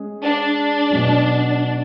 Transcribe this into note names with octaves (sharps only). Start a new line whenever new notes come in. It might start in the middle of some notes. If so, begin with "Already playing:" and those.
Already playing: G#3 C#4 G#4
D4
B2 F#3 C#4